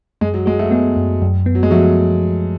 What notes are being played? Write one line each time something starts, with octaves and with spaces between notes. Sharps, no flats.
F#2 G#3
F#3
G#3 F#4
F#3 A3
G#3 B3
F#2
F#2
B3
F#3
G#3
F3 F#3 A3